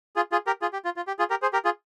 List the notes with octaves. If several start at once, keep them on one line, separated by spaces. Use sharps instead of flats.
F4 G#4
F4 G#4
G4 A#4
F4 G#4
G4
F4
F4
G4
F4 G#4
G4 A#4
G#4 C5
G4 A#4
F4 G#4